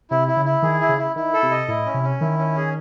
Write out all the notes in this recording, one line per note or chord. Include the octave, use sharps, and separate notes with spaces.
C3 E4
E4
C#3
E4
D#3 G#4
E4
C#3
E4
D#3 E4
A4
C3
D#5
A2 E4
C#4
C3
C#4
D#3 E4
C#4
G#4